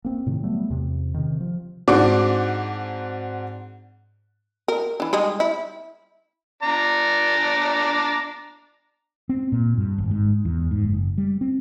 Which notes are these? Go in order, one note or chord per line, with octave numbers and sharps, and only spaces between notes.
A#3 C4
A2 C3 D#3
F#3 G3 A3 B3
E2 C3
C3 D#3
F3
G#2 C4 D4 F#4 C6 D6
A#4
E3 D4
G3 G#3 D#4
E4
D4 D5 A#5
C4
A#2
G2
G#1
G#2
E2
G#2
F#1
G3
C4